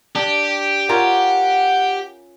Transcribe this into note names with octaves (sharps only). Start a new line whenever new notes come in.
D4 G4
C#4 F4 A#4 F#5